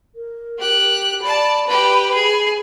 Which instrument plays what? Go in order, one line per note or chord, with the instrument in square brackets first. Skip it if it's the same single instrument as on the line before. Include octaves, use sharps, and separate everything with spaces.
[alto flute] A#4
[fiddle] G4 F#6
[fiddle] D5 A5 [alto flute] B5
[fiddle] G4 B4
G#4